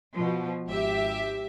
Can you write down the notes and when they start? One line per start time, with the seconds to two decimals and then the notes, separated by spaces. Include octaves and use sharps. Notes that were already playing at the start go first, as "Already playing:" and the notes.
0.13 B2 F3
0.67 G#1 G4 E5